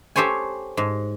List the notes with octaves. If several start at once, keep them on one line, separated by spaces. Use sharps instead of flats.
G4 A4 C5 C#5 G#5
G#2